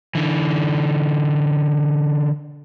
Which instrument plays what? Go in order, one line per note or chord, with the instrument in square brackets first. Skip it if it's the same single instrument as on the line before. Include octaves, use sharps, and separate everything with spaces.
[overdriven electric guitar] D3 E3